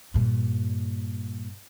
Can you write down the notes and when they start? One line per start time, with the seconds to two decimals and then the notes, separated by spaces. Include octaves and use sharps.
0.14 G2 A#2